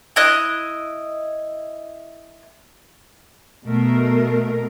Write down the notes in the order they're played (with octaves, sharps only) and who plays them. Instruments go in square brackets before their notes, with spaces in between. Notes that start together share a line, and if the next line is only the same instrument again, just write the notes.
[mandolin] E4 D#5 F#6
[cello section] B2 A3 A#4